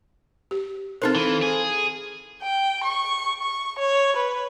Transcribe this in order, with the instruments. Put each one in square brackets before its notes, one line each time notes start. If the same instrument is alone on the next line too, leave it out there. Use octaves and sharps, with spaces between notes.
[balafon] G4
[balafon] C4 D#4 A#4 [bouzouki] F4 A4 C5
[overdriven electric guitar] E3
G#4
[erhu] G5
C#6
C#6
C#5
B4